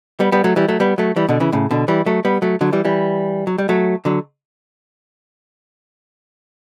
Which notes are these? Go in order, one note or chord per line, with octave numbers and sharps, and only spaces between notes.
G3 B3
G3 B3
F#3 A3
E3 G3
F#3 A3
G3 B3
F#3 A3
E3 G3
B2 D3
C#3 E3
A2 C#3
B2 D3
E3 G3
F#3 A3
G3 B3
F#3 A3
D3 F#3
E3 G3
E3 G3
F#3
G3
F#3 A3
D3 F#3